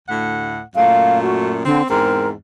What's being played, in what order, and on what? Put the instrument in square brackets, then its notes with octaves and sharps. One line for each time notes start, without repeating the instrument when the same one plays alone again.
[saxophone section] D2 A2 F#5
[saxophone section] F#2 A#2 A3 [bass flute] F5
[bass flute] F#4
[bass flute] D3 [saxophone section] C4
[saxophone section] E2 G#2 C4 [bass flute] A#4